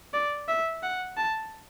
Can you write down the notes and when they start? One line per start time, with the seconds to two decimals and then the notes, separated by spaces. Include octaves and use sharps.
0.14 D5
0.48 E5
0.83 F#5
1.17 A5